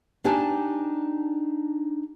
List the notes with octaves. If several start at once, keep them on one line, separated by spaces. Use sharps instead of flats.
D4 D#4 G4 G#5 A5